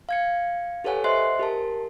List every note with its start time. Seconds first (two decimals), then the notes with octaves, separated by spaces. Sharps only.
0.09 F5 G#6 C#7
0.84 G4 A4 B4 C#5 F#5 G#5
1.04 C5 D#5 E5 C6 F#6 C7
1.39 G4 A#4 A5